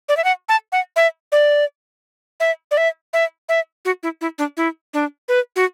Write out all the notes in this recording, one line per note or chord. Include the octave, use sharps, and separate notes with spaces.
D5
E5
F#5
A5
F#5
E5
D5
E5
D5
E5
E5
E5
F#4
E4
E4
D4
E4
D4
B4
F#4